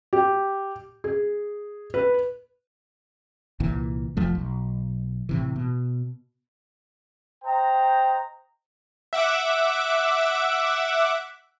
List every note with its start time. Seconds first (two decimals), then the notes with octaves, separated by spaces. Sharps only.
0.13 G4
1.04 G#4
1.94 B4
3.60 C2 A#2 E3
4.17 F1 F2 F3 A3
4.35 B1
5.29 A2 C3 E3
5.56 B2
7.44 C5 D#5 G5 A#5
9.13 E5 F#5 D6